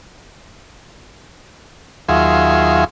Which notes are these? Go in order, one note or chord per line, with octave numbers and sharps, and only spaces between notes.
D#2 F#3 F4 G#4 E5 C6